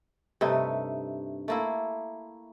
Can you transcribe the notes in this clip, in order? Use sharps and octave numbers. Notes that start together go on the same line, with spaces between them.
G2 C3 A3 D#4
A3 A#3 E4